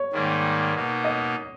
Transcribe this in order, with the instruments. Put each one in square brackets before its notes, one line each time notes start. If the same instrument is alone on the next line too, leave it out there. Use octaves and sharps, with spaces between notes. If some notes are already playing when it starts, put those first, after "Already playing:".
Already playing: [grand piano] C#5
[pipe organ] G#2 D#3 G3 A#3
B2 A#3 D#4
[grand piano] D#5